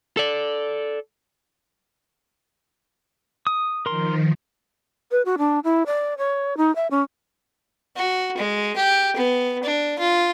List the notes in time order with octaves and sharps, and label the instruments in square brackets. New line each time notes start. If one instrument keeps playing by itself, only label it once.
[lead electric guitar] A4 D5
[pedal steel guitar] D#6
[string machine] D#3 F3 [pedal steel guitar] A#4 C6
[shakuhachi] B4
F#4
D4
E4
D5
C#5
D#4
E5
C#4
[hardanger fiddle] F#4
G#3
G4
B3
D4
F4